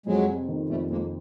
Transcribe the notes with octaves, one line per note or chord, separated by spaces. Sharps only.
F2 F#3 G#3
C3
D#3
F2 G3 A3
F2 G#3 A#3